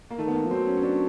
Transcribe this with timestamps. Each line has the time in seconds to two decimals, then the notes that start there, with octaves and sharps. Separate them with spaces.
0.10 A#3
0.18 D#3 A3
0.27 B3
0.34 A#3
0.46 F3
0.50 F#3 C4
0.67 C#4
0.77 C#4
0.83 D4